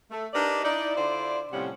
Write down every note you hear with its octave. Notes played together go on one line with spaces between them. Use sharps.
A3
D4 D#4 G4 A#4 B4 D5
D#4 E4 D5
D3 E4 F4 C5 D5
A2 C3 F3 G3 C#4 F#5